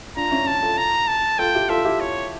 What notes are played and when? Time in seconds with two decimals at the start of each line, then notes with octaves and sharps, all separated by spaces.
0.16 D4 F4 A#5
0.31 C#4 E4
0.46 C#4 A5
0.62 F4 A4
0.78 A#5
1.08 A5
1.39 F4 A4 G5
1.55 E4 G4
1.69 F4 A4 E5
1.85 E4 G4
2.01 C#5